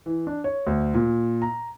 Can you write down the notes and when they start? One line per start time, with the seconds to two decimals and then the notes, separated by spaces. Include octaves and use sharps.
0.06 E3
0.27 D4
0.44 C#5
0.67 D2
0.94 A#2
1.42 A#5